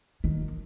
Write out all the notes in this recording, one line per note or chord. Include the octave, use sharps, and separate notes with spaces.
D#3